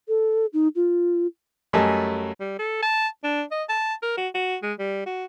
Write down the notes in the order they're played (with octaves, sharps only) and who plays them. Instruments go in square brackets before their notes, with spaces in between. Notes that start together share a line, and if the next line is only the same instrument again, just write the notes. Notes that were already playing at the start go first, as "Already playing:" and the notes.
[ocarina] A4
D#4
F4
[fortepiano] F#2 G3 A3 D#5 G#5 A5
[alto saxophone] G3
A4
A5
D4
D#5
A5
A#4
F#4
F#4
G#3
G3
F#4